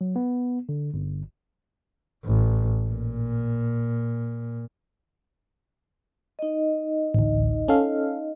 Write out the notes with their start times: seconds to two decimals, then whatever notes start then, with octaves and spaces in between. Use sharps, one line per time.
0.01 F#3
0.16 B3
0.69 D3
0.94 G1
2.25 A1
2.89 A#2
6.39 D#4 D#5
7.14 A1 D2
7.68 C#4 A4 F5